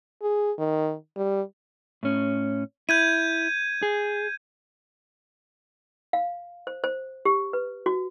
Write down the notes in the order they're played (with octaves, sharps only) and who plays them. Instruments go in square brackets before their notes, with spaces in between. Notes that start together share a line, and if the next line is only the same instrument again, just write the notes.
[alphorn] G#4
D#3
G3
[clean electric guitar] A2 C#4
[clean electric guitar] E4 [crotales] G6 G#6 D#7
[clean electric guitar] G#4
[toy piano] F5
C5
C5
G4
B4
F#4